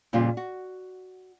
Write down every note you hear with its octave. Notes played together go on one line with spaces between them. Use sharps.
F2 A#2 C#3 G3 F4
F#4